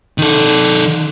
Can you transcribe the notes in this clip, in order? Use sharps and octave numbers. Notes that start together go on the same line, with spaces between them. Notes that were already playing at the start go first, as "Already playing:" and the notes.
D#3 A4